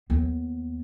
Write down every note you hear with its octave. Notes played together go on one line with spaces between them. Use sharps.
D#2 B3